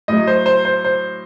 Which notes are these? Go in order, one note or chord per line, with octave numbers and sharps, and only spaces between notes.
A2 F#3 D#5
C5
C5
C5
C5